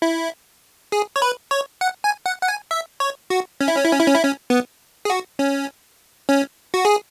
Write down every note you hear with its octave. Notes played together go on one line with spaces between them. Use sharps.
E4
G#4
C#5
B4
C#5
F#5
G#5
F#5
F#5
G#5
E5
C#5
F#4
C#4
E4
C#4
E4
C#4
E4
C#4
E4
C#4
B3
G#4
F#4
C#4
C#4
F#4
G#4